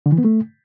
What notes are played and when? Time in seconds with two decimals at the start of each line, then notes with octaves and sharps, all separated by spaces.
0.06 D3
0.12 E3
0.18 B3
0.25 A3